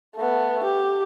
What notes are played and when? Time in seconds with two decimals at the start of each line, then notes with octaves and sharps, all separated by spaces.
0.16 A3 B3
0.64 G4